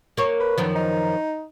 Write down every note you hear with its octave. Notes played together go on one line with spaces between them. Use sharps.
A#3 C#5
B4
F#2 D#3 F3
D#4